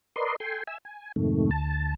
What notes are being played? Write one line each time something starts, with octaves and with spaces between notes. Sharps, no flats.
A#4 B4 D5 D#5 C6
A4 G5 G#5 C6
E5 G#5 E6
G#5
F2 G#2 C3 D#3 A3
D2 A5